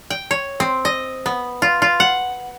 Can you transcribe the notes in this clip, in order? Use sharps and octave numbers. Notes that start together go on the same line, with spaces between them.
G5
C#5
C4
D#5
B3
F4
F4
F#5